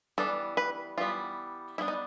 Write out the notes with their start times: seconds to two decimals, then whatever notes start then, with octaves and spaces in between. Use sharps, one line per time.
0.18 E3 G3 B3 D4 A4
0.57 B4
0.98 E3 G3 B3 F4
1.78 G3 B3 D4 E4
1.88 D#4